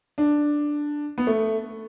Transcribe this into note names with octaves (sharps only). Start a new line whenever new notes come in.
D4
B3
A3